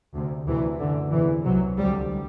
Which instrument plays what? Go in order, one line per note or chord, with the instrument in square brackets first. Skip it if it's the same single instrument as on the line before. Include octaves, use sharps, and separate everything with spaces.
[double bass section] D2 C3
D2 C3 E3
F#2 D3
E2 C3 E3
C2 C3 F#3
D2 C3 G3